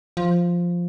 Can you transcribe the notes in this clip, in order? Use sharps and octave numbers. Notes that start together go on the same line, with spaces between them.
F3